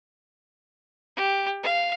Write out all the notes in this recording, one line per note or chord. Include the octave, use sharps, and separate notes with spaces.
G4
F5